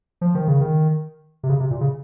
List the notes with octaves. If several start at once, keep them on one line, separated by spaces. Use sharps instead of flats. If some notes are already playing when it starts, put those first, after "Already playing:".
F3
D#3
C#3
D#3
C3
C#3
C3
A#2
C#3